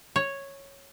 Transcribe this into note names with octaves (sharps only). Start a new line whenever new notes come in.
C#5